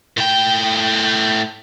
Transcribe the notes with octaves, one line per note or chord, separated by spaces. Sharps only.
A2 G5